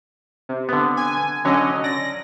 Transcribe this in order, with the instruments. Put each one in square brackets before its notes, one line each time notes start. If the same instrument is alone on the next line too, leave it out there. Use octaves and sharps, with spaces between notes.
[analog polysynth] C3
[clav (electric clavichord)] D3 B3
[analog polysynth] G#5
[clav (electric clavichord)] D3 F#3 C#5 [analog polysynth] C#4 D#5
[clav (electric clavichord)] D5 [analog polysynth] A#6